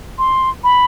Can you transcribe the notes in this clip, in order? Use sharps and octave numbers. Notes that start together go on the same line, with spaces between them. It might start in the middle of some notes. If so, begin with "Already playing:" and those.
C6
B5